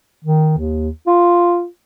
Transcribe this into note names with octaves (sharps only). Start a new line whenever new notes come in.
D#3
D#2
F4